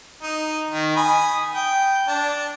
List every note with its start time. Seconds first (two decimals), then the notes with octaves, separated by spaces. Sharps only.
0.22 D#4
0.70 D#3
0.96 G#5 B5 D#6
1.54 G5
2.08 D4 A5